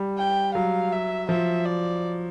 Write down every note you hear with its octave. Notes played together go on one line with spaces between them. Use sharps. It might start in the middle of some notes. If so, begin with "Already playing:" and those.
Already playing: G3
G5
F#3 F5
E5
F3 E5
D5